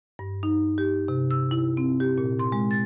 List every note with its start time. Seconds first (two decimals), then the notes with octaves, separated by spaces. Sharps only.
0.19 G2
0.43 D#4
0.78 G4
1.08 C3
1.31 E6
1.51 E4
1.77 C4
2.00 G4
2.18 A#2
2.39 C6
2.52 G#3
2.71 A6